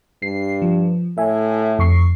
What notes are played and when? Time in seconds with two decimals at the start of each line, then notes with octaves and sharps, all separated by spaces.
0.22 G2 C7
0.62 F3
1.18 A2 E5 G#5
1.79 F2 C#6 C7